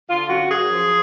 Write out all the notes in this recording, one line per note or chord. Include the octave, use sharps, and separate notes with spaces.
D3 F4
F#2 F#4
F#2 G#4
F3